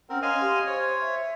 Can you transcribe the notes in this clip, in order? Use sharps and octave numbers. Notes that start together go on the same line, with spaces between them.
C4 C#4 A#4 F#5 F6
C#5 D#5 F5 G#5 C6
G4
C5 C#5 C6
E5